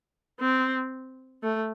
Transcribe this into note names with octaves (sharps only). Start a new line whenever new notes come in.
C4
A3